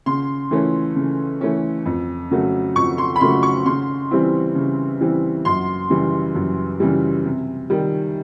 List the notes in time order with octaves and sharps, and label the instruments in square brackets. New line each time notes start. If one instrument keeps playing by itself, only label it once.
[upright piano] C#3 C6
E3 A3 C#4
C#3
E3 A3 C#4
F2
C#3 F#3 A3
F2 C#6
C6
B5
C#3 F#3 A3 C6
C#6
C#3 C6
E3 G3 C4 E4
C#3
E3 G3 C4 E4
F#2 C6
C#3 E3 G3
F#2
C#3 E3 G3
C3
D#3 G3